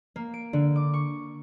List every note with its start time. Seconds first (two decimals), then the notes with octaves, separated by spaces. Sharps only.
0.16 A#3
0.34 D7
0.53 D3
0.76 D6
0.94 C#6